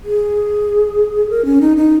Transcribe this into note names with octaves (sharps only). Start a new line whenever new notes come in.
G#4
A#4
C#4
D#4
D#4